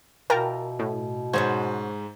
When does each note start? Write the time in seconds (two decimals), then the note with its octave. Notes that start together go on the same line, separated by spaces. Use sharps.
0.30 B2 E3 F4 A#4 G5 A5 A#5
0.79 A2
1.33 G#2 B3 C#4 F#4 C5 G#6